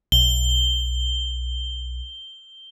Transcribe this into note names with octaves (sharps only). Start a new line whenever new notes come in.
B1 G7